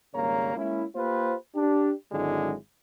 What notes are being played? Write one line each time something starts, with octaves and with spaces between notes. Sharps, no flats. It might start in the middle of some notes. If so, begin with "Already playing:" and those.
G#1 C#3 G3 A#3 C#5 A#5
G#3 A#3 C#4 E4
A#3 F4 G4 B4 C5
D4 G4
G#1 D3 F#3 G#3 D4 E4